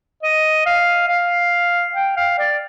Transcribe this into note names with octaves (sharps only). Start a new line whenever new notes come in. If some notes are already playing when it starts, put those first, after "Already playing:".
D#5
F5
F5
G5
F5
D5